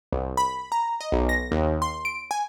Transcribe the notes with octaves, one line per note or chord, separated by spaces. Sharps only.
C2
B5
A#5
D#5
B1
A#6
D#2
C6
D7
G#5